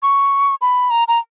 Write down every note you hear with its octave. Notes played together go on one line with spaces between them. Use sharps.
C#6
B5
A#5
A#5